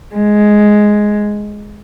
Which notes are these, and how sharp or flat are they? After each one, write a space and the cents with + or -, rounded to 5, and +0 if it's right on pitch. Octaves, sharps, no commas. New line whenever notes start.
G#3 +5